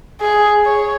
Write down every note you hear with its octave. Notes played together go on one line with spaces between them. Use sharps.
G#4
C#5